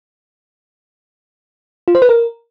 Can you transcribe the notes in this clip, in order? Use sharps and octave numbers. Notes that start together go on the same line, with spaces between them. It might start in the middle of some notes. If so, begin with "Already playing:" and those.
F4
C5
B4
A#4